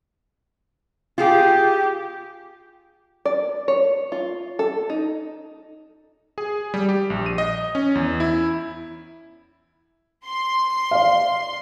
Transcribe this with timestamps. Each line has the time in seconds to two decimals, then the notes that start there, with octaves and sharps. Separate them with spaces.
1.18 F4 G4 G#4
3.25 D5
3.68 C#5
4.12 F4
4.59 A4
4.90 D#4
6.38 G#4
6.74 G3
6.89 G4
7.10 A#1
7.26 D#7
7.38 D#5
7.75 C#4
7.95 E2
8.20 E4
10.25 C6
10.91 D5 F5